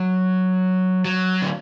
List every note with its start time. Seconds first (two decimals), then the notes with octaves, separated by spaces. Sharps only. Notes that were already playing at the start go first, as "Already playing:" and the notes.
Already playing: F#3
1.05 F#3
1.42 D3